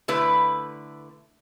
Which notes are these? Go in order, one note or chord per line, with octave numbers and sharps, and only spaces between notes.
D3 A3 E4 B4